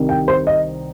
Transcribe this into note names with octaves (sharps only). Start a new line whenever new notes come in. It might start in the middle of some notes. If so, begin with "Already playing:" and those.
Already playing: C2 C3 D#3
G5
C5
D#5